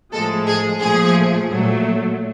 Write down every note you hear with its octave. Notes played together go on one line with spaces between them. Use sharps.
A2 F3 G#3 A4
G#4
A#2 F3 A3 G#4
A#2 F#3 A3